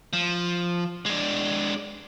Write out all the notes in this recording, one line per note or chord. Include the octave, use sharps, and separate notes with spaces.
F3
G#3 D4